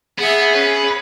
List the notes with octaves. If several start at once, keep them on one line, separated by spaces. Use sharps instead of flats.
B3 G#4 E5 F#5
C#4 B4